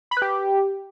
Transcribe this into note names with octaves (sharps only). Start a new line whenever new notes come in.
B5
B4
G4